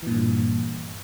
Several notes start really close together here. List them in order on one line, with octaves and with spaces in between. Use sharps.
E3 A#2 G2